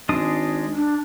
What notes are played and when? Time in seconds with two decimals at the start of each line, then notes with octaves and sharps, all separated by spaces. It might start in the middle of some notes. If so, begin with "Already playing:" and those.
0.09 G#1 G#3 D4 D#6
0.75 D4